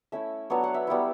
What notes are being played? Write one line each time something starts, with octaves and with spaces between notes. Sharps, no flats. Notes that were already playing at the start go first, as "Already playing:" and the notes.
A3 C#4 E4 E5
F#3 B3 D4 C#5
F#5
E5
G3 B3 E4